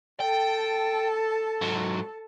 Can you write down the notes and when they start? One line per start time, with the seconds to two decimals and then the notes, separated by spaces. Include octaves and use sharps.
0.20 A4 G5 A5
1.62 G#2 F#3